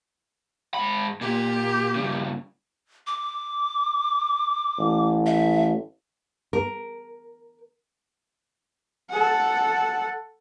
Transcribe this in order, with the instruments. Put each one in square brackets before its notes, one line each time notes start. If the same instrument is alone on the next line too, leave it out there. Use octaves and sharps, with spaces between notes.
[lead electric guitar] G#2 B5
[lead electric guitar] A#2 [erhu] G4
[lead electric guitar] G2 C#3
[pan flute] D6
[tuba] A1
[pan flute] E5
[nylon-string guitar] A#4
[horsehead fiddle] A4 F#5